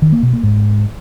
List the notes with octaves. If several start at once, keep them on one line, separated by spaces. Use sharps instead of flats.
D#3
A#3
B2
A#3
G#2